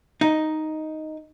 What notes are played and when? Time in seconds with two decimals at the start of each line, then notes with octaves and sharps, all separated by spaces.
0.21 D#4